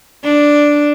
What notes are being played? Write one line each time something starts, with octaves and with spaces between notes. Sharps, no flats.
D4